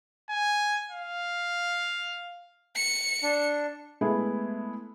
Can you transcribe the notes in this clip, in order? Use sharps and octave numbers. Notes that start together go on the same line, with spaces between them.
G#5
F5
C#7
D4
G#3 A3 B3 E4 G#4